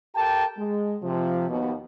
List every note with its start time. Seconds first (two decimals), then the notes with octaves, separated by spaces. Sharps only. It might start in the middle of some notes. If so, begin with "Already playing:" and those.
0.16 G4 A4 A#4 G5 A5
0.58 G#3
1.03 C3 F3
1.49 D#2 B2